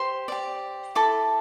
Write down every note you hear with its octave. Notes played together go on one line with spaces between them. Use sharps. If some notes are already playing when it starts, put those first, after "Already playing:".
Already playing: G4 C5 C6
G4 D5
E4 A4 D6